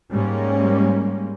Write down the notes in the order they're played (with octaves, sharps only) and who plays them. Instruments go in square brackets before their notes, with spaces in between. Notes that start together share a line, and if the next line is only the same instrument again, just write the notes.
[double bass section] G#2 G3 G#3 A#3 C#4